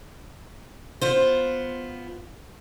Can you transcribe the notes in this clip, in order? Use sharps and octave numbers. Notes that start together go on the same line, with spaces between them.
B3 F4 C5